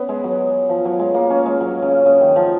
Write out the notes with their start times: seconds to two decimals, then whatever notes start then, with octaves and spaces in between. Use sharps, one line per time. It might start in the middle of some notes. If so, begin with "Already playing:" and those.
Already playing: B3 C#4
0.09 G#3
0.24 F#3
0.69 F3
0.85 F#3
0.99 G#3
1.14 A#3
1.30 C#4
1.46 G#3
1.60 F#3
1.82 C#3
2.06 C#3
2.21 D#3
2.36 F3